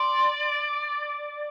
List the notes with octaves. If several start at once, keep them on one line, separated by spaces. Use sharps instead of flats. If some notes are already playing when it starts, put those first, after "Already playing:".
Already playing: D5 C6